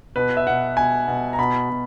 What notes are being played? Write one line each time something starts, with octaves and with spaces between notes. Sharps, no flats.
B2 B4
E5
B2 F#5
B2 G#5
B2
A#5
B2 B5
B2